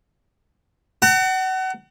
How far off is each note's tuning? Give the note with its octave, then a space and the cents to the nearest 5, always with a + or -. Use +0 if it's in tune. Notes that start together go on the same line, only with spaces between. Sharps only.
F#5 +30 A#5 -45